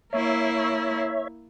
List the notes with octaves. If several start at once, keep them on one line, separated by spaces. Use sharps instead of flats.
A#3 E4 C#5 E5